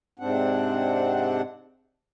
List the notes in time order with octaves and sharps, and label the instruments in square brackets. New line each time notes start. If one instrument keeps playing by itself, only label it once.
[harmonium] G#2 C3 C4 D4 F#5